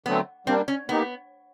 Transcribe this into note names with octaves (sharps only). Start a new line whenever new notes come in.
D3 F#3 A3 B3 C4
G3 A#3 C4 D4
C#4
A#3 B3 D#4 G4